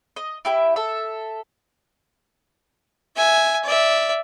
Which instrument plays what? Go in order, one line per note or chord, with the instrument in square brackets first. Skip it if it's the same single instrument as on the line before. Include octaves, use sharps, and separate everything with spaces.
[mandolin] D#5
E4 G4 E5
A4 E5
[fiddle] E5 G#5
D5 E5